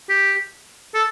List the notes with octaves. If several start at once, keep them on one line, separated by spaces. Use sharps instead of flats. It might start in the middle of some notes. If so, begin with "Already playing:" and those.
G4
A4